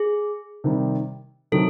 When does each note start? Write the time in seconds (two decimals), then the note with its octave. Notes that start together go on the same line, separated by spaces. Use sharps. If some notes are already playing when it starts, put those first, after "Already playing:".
Already playing: G#4
0.64 C3 D#3 G3
1.52 C3 D#3 F#3 A4